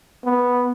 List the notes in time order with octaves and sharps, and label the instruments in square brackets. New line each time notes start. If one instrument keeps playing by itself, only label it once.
[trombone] B3